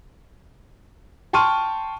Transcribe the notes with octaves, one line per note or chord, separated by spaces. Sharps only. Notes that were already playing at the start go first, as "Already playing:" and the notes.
G5 A5 C6 C#6 F6 D#7